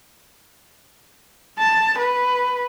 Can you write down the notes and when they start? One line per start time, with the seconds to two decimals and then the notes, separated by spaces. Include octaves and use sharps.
1.59 A5
1.99 B4